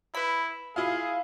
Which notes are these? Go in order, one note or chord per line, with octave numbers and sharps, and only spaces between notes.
E4 B4 B5
E4 F4 G#4 F5